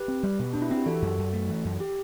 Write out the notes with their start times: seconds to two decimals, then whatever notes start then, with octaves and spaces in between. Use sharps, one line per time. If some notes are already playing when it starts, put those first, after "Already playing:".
Already playing: G4 B4
0.08 C4
0.23 G3
0.39 B2
0.53 B2 D4
0.62 E4
0.69 C4 F#4
0.77 G4
0.86 E3 F#4 A4
1.02 F#2
1.18 F#2
1.33 A3
1.49 E3
1.65 F#2
1.80 G4